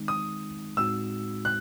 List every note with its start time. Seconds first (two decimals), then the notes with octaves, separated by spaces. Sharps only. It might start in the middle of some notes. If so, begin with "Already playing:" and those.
Already playing: D#3 G#3 C4 D#4
0.08 D#6
0.77 A2 G#3 C4 D#4 F#4 E6
1.45 F#6